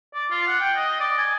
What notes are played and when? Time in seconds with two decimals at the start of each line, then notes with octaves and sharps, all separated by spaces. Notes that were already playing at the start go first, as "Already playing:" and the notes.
0.14 D5
0.31 F4
0.47 F#5
0.60 G5
0.76 D#5
1.00 D5
1.18 G#5